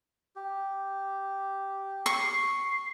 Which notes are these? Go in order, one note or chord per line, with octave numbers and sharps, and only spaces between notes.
G4
C#6 C7